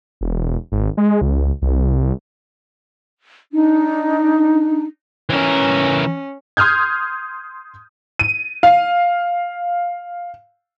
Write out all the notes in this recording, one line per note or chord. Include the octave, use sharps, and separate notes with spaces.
E1
G#1
G#3
C#2
C2
D4 D#4
E3 C#4 A#4
C6 D#6 F6 G6 G#6
D#7
F5